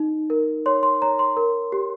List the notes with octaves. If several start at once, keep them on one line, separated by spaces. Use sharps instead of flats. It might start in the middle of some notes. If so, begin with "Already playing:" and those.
Already playing: D#4
A#4
C#5 C6
C6
C#5 A#5
C6
A#4
G4